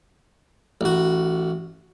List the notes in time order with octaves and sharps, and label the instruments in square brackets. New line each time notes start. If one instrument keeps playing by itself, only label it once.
[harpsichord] A1 F#4